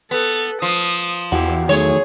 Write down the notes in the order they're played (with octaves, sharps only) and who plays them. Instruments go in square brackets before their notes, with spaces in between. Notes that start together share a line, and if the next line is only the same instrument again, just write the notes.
[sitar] B3 [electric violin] A4
[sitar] F3 [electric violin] D#6
[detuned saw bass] E2 [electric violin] E4 [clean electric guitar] F#4 G4
[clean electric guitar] D#3 F#3 A3 [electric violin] G#4 [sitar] C#5